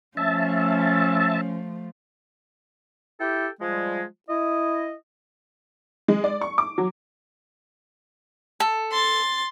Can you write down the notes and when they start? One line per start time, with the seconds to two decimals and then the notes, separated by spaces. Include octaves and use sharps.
0.17 F3 A3 C#4 E5 A5
3.19 E4 G4 A4 G5
3.60 F3 G3 G#3
4.29 E4 D#5
6.08 G#3
6.24 D5
6.41 C#6
6.58 D6
6.78 F#3
8.60 A4
8.91 C6 A6